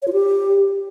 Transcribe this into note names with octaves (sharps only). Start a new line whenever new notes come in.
C#5
F4
G4